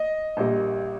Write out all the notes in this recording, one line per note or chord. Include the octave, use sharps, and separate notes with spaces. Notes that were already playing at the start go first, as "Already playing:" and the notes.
Already playing: D#5
A#1 A#2 G3